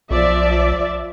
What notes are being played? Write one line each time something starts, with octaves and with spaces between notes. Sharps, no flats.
B1 F3 D5 E5